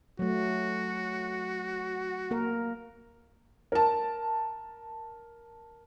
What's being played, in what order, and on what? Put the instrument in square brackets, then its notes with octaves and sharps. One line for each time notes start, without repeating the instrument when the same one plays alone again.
[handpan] F#3 A3 [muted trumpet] F#4
[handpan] A#3 A#4
[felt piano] A#4 A5